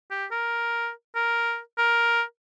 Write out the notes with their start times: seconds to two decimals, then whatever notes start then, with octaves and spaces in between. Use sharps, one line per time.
0.11 G4
0.31 A#4
1.15 A#4
1.78 A#4